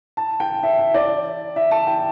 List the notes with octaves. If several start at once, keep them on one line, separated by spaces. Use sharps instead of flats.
A5
G5
E5
E5
D5
E5
A5
G5